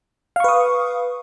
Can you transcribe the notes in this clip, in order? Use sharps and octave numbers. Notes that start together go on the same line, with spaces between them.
B4 F5 C#6 D#6